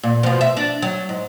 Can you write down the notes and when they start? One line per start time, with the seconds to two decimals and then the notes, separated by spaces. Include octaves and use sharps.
0.03 A#2
0.23 B2 F3
0.41 E5
0.57 D4
0.82 F#3
1.09 G#2